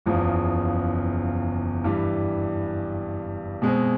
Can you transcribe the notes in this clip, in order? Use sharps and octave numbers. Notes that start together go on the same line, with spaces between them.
F#1 E2 C#3 F3
G2 E3 G3
B2 G#3 C4